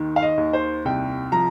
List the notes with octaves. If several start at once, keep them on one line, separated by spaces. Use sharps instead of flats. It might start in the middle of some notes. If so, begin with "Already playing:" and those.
Already playing: D#2 D#3
F5
D#5
D#2
C5
C2 G5
F3 A#5